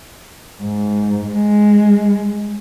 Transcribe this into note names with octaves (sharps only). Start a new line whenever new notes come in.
G#2
G#3